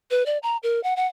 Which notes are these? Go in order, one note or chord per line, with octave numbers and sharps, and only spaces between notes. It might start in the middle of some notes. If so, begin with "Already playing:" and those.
B4
D5
A#5
A#4
F#5
F#5